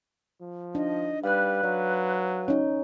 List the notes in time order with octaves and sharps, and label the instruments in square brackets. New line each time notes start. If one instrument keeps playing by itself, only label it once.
[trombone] F3
[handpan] D4 D#4 [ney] D#5
[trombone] G3 [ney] B4 [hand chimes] F5 F#6
[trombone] F#3 [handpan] D5
[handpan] C#4 D#4 [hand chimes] C#5